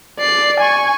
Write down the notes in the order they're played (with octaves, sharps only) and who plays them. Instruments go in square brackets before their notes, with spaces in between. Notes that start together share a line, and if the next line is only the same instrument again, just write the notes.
[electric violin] D5 C7
G#5 C#6